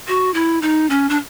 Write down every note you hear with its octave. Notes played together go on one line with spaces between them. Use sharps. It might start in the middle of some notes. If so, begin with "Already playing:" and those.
F#4
E4
D#4
C#4
D4